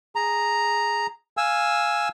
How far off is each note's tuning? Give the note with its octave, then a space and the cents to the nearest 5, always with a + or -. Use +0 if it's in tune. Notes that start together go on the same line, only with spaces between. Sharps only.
G#4 -5 A#5 +0
F5 +0 G#5 +0 E6 +0